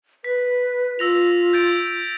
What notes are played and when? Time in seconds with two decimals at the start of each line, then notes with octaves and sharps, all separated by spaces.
0.24 B4 B6
0.99 F4 E6 A#6 F7
1.53 G6 A6 D7